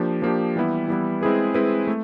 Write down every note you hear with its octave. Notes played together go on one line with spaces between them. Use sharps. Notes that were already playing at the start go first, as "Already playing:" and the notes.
Already playing: F3 A#3 D4 G4
F3 A#3 D4 G4
E3 G3 B3 E4
E3 G3 B3 E4
G#3 C4 E4 G#4 B4
G#3 C4 E4 G#4 B4
A3